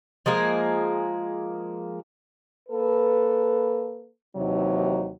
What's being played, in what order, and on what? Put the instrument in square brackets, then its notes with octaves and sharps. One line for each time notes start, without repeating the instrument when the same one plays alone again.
[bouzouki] F3 G#3 A#3 G#4
[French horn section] A#3 A4 B4
D#2 C3 E3 F#3 D#4